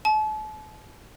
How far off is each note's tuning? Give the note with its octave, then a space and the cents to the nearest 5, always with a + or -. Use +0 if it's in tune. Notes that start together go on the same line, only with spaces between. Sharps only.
A5 -40